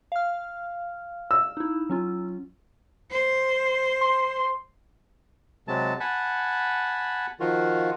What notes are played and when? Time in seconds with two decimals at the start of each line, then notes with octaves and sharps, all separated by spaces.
0.12 F5 F6
1.31 E6
1.57 D#4 E4
1.90 F#3 C#4 F4
3.11 C5
4.01 C6
5.68 C3 F#3 G#3 A5
6.00 F#5 G#5 A5 B5
7.40 D#3 F3 F4 F#4